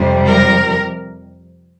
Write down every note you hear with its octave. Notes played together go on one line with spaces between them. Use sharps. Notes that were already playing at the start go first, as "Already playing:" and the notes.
Already playing: F2 C3 G3 C5
A#4